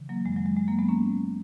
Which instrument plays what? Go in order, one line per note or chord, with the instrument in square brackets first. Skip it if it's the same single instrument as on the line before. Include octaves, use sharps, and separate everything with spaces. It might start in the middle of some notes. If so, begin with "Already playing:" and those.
Already playing: [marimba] C#3 E3
F#3 A#3
F#2 D#3 G#3
F#3
G#3
G#3
F#3 A#3
G#3 B3
A#3 C#4